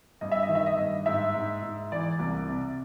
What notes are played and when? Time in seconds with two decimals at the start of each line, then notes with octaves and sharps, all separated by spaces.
0.21 G2 D#5
0.31 E5
0.43 D#5
0.49 D#3
0.55 E5
0.66 D#5
0.77 G2
1.06 G#2 E5
1.34 G#2
1.62 G#2
1.92 E3 D5
2.19 C2
2.49 C3